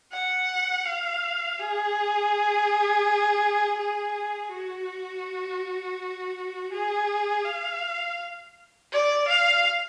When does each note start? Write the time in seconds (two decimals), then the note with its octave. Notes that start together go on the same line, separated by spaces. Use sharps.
0.13 F#5
0.85 F5
1.59 G#4
3.79 G#4
4.52 F#4
6.72 G#4
7.45 F5
8.92 D5
9.28 F5